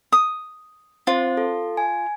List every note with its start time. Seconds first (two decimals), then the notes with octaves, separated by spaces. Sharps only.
0.12 D#6
1.07 C4 F4 C5
1.37 A4
1.77 G#5